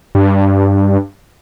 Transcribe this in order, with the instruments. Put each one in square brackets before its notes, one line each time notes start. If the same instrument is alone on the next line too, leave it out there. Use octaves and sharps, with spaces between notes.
[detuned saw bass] G2